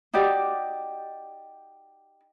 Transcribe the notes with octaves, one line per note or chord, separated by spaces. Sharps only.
D#4 F#4 G4 D5